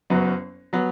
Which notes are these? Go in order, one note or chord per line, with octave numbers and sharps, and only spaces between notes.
F#1 F#2 F#3 B3
F#3 B3